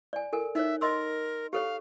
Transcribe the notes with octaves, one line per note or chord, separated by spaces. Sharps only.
D5 G#5
A4 A#4 G#5
D#4 C#5 E5
A#4 D#5 C6 E6
G4 A4 C#5 F5